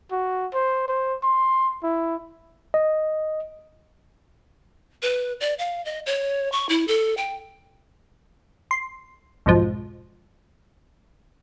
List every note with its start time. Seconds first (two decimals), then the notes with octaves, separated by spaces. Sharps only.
0.11 F#4
0.53 C5
0.88 C5
1.23 C6
1.83 E4
2.74 D#5
5.02 B4
5.40 D5
5.59 F5
5.85 D#5
6.06 C#5
6.52 C#6
6.69 E4
6.88 A4
7.17 G5
8.71 C6
9.46 B1 F2 G#2 F3